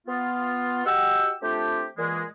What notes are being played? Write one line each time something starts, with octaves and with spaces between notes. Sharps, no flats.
B3 F4
F#4 G4 D#5 F#5 G5 E6
A3 C4 D4 F4 G4
A#2 E3 G#3